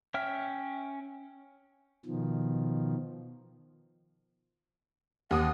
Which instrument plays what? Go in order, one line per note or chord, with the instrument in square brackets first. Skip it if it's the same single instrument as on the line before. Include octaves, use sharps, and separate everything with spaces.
[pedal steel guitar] C#4 E5 G5 F6
[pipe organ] B2 D#3 F3
[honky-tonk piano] D#2 D#6 [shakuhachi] F#5